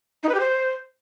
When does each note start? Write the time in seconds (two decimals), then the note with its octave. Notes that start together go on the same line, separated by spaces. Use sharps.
0.23 D#4
0.29 B4
0.34 G4
0.40 C5